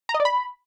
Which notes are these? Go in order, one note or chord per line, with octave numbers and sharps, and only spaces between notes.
A#5
D#5
D5
B5